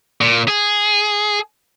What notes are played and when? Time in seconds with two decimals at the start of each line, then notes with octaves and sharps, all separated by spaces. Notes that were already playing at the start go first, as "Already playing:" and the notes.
0.21 A#2
0.48 G#4